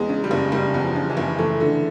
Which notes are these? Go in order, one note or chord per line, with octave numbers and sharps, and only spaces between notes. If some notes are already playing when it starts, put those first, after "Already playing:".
Already playing: E2 G#3
C#3
G3
F#1
F#1 G3
E2
F3
C#3
E3
F#1
E3 A3
D3